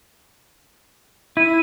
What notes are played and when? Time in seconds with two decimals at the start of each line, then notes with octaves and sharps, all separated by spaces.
1.37 E4 D#7